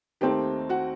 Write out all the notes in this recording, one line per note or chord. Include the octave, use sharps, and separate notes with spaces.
D#2 D#3 A3 C4 D#4 G4 G5
F#4 F#5